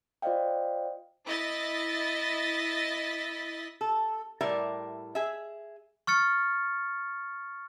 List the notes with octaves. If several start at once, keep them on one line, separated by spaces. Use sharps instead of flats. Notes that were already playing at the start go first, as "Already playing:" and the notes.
F4 C5 D5 D#5 F5 G5
E4 D#5 A6 B6
A4
A2 G3 A#4 D5 E5
G#4 E5
C#6 F6 A6 C#7